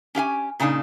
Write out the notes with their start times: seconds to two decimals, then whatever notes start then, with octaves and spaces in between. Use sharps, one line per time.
0.15 C#4 G4 F5 G#5
0.60 A#2 C#3 D4 D#4 A5